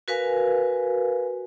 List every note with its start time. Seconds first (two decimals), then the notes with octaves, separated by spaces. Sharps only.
0.08 F#4 A#4 B4 F5 G#5